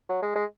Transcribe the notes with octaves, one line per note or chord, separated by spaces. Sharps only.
F#3
G#3
G#3